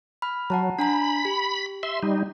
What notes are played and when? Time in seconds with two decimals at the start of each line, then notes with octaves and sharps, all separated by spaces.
0.22 B5 F6
0.50 F#3 F#5 A5 A#5
0.79 D4 G#5 A#5 B5
1.25 G4
1.83 E5 C6
2.03 G3 D#4